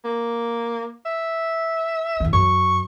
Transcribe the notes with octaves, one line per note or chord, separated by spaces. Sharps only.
A#3
E5
E2 D#3
F#2 C#6